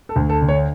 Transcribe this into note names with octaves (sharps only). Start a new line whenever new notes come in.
A4
D2
A4
D3
C#5